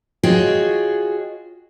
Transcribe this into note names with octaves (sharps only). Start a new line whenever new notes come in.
F4 F#4 G#4 C#5 D#5 G5